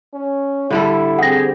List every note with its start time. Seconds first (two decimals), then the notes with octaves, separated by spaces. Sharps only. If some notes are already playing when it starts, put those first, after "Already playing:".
0.14 C#4
0.70 D3 G3 E4 A4
1.19 C4 G4 G#4 F#5 A#6